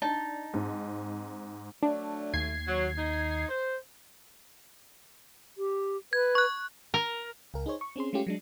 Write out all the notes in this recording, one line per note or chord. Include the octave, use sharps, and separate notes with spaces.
D4 D#4 A5
G#2 C4
F#3 A3 D4
D#2 G#6 C7
F#3
D#4
C5
G4
B4 G#6
C#6 F#6
A#4
C#2 A#4
D#4 G#4 C5 C#5
C#6
C4 C#4 G#4 C6
G#3 A3 C#4 F4 G4
F#3 G#3 D4